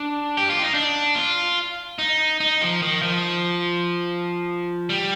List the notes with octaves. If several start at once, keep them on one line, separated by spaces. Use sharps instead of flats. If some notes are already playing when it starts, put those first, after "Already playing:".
Already playing: D4
G4
F4
D#4
D4
F4
D#4
D#4
F3
D#3
F3
G3